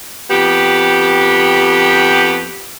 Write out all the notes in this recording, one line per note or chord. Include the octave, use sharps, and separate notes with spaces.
F2 B3 G4